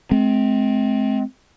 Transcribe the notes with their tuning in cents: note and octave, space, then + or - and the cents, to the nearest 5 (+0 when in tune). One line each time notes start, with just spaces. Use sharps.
G#3 +45 C4 -5